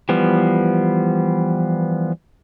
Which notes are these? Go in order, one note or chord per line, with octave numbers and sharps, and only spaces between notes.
E3 F3 G3 B3